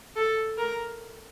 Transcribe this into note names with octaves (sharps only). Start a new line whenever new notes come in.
A4
A#4